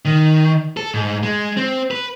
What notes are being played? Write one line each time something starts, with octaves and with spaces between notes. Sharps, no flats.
D#3
A4
G#2
G#3
C4
B4